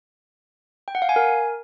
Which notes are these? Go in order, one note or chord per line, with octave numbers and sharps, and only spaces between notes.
G5
F#5
F5
G#5
A#4